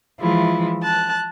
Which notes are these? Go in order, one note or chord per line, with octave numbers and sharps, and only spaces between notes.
E3 F3 G#3 E4 F4
A5 F#6